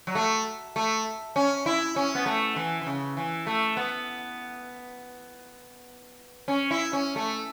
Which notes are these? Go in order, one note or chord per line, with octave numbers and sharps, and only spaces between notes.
F#3
A3
A3
C#4
E4
C#4
B3
A3
E3
E3
C#3
E3
A3
B3
C#4
E4
C#4
A3